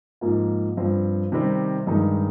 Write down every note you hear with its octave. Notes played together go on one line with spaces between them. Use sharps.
G#2 F3 A#3 F4
G2 F3 C4
C3 D#3 G3 C4
G2 D#3 G#3 D#4